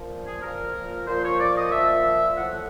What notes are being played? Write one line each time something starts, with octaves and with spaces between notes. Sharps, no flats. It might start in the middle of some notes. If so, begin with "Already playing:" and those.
Already playing: A#2 F3
G#4
A#2 F3 A#4
A#2 F3 C5
C#5
D5
D#5
A#2 F3 E5
A2 F3 F#5